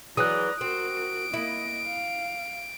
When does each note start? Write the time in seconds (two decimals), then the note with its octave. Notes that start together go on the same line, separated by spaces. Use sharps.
0.17 E3 F#3 G#4 D5 A#5 D#6 F#6
0.61 C4 F#4 A#4 D7
1.34 A#3 E4 D#5
1.86 F5